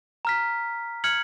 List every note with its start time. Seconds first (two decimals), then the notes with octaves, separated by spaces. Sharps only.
0.25 A#5 F6 B6
1.04 F6 G#6 C#7 F#7